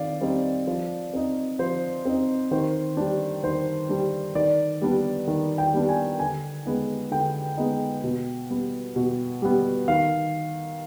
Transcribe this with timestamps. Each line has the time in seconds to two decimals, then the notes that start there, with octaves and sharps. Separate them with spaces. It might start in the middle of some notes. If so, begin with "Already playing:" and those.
Already playing: D#3 C4 D5 F5
0.21 G3 C4 D#4
0.67 F3
1.14 C4 D#4
1.59 F3 C5
2.05 C4 D#4
2.51 D#3 C5
2.97 G3 D4
3.43 D#3 C5
3.89 G3 D4
4.35 D#3 D5
4.82 G3 B3 D4
5.27 D#3
5.58 G5
5.73 G3 B3 D4
5.89 G#5
6.19 D3 G#5
6.66 G#3 B3 D#4
7.11 D3 G5
7.57 G#3 B3 D#4
8.04 B2
8.50 G3 B3
8.96 B2
9.42 G3 B3
9.88 D#3 F5